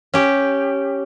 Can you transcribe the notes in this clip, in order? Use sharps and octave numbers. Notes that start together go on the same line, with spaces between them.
C#4 G4